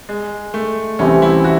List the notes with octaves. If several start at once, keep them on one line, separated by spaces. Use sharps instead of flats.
G#3
A3
C2 C3 E3 C4 C#4
E4
F#4